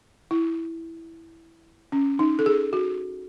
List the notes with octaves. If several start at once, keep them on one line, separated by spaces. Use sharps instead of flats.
E4
C#4
D#4
A4
G#4
F#4